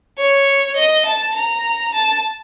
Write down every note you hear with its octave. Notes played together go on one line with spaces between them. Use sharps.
C#5
D#5
A5
A#5
A5